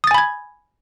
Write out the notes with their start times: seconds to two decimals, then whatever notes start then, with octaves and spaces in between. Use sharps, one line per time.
0.04 D#6
0.07 A6
0.11 G#5
0.14 B5
0.18 G#6